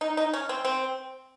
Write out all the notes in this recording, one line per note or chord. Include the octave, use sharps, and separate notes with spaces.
D#4
D#4
C#4
C4
C4